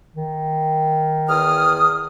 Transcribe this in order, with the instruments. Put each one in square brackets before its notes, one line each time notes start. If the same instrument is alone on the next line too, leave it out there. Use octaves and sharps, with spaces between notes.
[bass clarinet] D#3
[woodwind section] E2 D#6 F6